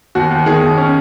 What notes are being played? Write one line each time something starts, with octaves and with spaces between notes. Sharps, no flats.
D#2 F#4
D#2
D#3 G#4
D#2
C#4